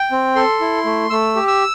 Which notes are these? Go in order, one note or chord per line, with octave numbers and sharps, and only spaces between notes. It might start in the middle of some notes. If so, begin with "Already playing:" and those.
Already playing: G5
C4
A4 C6
E4
A3
A3 E6
G4
E6